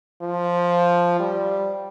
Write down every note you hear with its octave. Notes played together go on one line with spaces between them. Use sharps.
F3
G3